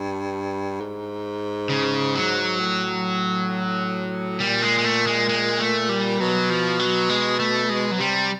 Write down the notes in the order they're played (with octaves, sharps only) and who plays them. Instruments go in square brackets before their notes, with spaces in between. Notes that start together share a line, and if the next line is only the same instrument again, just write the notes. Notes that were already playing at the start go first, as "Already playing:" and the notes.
Already playing: [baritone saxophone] G2
G#2
[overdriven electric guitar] C#3
F#3
[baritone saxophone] A2
[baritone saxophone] A#2 [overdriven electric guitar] G3
[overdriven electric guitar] G#3
G#3
A3
G#3
G#3
A3
G3
[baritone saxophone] B2 [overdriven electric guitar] F#3
[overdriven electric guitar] F3
F#3
G#3
A3
G#3
F#3
[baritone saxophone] C3 [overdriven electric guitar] G3